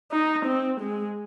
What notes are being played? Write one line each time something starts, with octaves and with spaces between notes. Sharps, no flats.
D#4
C4
G#3